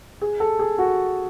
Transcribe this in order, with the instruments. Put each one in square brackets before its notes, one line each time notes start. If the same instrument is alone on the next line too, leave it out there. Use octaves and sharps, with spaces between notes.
[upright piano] G#4
A4
G#4
F#4